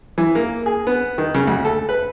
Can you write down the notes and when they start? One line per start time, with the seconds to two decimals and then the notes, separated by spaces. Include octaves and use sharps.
0.18 E3
0.35 A#3
0.66 G#4
0.87 B3
1.18 D#3
1.34 C#3
1.47 D2
1.65 A4
1.89 B4